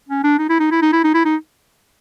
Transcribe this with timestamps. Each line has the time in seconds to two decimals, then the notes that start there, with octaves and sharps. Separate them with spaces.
0.09 C#4
0.24 D4
0.38 D#4
0.49 E4
0.60 D#4
0.71 E4
0.82 D#4
0.93 E4
1.04 D#4
1.14 E4
1.25 D#4